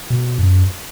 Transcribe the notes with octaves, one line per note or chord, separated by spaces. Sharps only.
B2
F#2